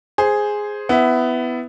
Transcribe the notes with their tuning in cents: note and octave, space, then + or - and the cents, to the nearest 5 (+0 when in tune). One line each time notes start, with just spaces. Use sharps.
G#4 +0 C5 +0
B3 +15 E4 +0